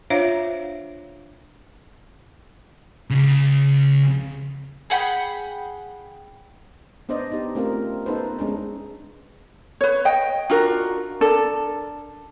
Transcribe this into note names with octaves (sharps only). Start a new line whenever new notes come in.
D4 F4 C5 C#5 E5 F5
C#2 C#3
G#4 F#5 G5 B5
B3 D4 C5 D5 D#5
D#4 G4
A3 C4 C#4 F4 A#4
B3 D#4 A4 B4 C5
G#3 C#4 D4
B4 C#5
D#5 G5
D4 F4 F#4 A#4
D4 A4 A#4